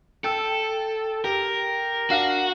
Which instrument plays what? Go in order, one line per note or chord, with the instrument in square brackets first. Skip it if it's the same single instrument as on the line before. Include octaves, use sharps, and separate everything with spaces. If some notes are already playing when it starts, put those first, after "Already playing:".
[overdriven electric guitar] A4 [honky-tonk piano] G5 E6
[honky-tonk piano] G4 [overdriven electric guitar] A#4
[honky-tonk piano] D4 F5 [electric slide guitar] F#4